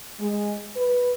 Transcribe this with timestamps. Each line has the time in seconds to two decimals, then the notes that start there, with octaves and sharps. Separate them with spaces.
0.20 G#3
0.77 B4